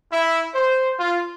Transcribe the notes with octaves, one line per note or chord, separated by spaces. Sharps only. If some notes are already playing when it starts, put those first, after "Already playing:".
E4
C5
F4